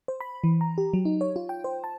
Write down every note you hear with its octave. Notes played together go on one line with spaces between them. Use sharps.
C5
B5
E3
A#5
G4
F#3
D#4
C#5
F4
G5
C5
A5